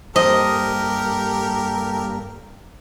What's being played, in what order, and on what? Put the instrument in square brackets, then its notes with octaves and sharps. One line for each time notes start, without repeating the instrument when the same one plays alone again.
[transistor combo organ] G2 A#3 [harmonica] G4 A4 A#4 [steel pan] C5 [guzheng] D#5